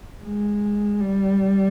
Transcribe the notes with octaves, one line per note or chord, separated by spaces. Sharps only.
G#3
G3